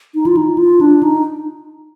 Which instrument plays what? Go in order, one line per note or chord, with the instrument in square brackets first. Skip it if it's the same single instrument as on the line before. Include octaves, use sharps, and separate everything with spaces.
[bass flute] D#4
F4
D#4
F4
D4
D#4